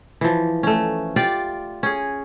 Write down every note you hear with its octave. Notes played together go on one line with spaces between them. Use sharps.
E3 F3
A3 C#4
F4 G4 D5
C#4 G#4